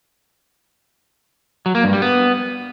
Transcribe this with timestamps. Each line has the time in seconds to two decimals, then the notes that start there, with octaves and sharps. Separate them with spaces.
1.66 F#3
1.75 A#3
1.84 G2
1.93 G3
2.02 B3